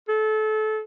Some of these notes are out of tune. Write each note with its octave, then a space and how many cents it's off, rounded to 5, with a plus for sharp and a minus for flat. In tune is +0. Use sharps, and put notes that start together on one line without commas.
A4 -25